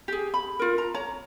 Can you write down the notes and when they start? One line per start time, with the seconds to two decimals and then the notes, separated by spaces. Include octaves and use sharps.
0.08 G4 G#4
0.34 B5
0.59 F4 A#4
0.78 A#5
0.94 C#5 A#5